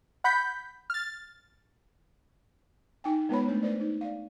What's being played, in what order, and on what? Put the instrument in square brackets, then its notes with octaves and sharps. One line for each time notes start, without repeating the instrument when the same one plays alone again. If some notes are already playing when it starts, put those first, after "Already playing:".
[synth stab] F#5 B5 G6 B6
F6 A6
[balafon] D#4 G5 G#5
G#3 B3 F4 B4 C#5 B5
A3 D4 C5
B4 C5 D5
D#4
D5 F5